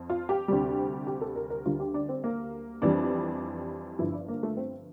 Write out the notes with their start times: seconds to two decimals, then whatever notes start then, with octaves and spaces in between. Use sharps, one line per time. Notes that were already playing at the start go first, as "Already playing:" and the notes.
Already playing: F2
0.10 F4
0.29 G4
0.48 D2 C3 G3
1.07 G4
1.21 A4
1.36 A#4
1.50 A#4
1.65 D2 D3 G3 F4
1.80 G4
1.94 D4
2.09 C4
2.24 A#3
2.82 F2 E3 G3 D4
3.99 G1 G2 F3 E4
4.13 D4
4.28 A#3
4.43 A3
4.57 C4